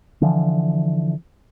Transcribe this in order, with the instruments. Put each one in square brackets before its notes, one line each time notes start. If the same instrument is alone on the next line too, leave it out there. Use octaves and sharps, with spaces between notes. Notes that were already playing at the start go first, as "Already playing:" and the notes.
[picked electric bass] D3 E3 F3